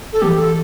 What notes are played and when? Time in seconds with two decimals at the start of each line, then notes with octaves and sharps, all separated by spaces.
0.13 A4
0.22 E3 G4
0.37 A4